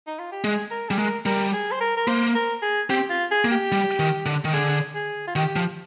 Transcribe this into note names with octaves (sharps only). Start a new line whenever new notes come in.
D#4
F4
G4
G#3 G#4
A#4
G3 G#4
G#3 A#4
G3 A#4
G#4
C5
A#4
A#4
A#3 C5
A#4
G#4
C4 G4
F4
G#4
A#3
G4
G3
D#3
D3
D#3
D3 G#4
G#4
F4
D#3 G4
F3